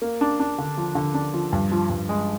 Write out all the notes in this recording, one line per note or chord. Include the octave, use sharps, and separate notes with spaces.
A#3
D4
D4
D3
F3
D3
D4
F3
G2
F3
G2
G#3